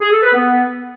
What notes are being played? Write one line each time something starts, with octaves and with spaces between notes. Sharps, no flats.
G#4
A4
B4
B3